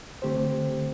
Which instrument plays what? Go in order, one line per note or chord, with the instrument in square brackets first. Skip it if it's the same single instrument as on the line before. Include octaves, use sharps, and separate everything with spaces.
[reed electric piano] D3 A3 C4 G4 C5